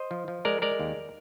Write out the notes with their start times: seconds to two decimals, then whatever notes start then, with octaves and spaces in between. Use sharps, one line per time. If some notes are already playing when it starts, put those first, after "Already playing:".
Already playing: C5 D#5
0.11 F3
0.28 F3
0.45 G#3 A#4 D5
0.62 G#3 A#4 D5
0.79 D#2